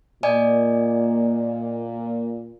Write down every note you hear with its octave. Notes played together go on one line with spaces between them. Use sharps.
A#2 D5 D#5 G#5